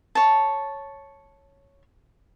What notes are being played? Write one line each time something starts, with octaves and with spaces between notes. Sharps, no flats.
C#5 A5